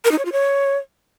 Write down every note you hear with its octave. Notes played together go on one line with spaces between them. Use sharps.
A#4
D#4
C#5
F4
C#5